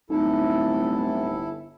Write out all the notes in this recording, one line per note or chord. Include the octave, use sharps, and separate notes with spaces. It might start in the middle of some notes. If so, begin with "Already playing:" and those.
D1 G1 D#4 E4 A4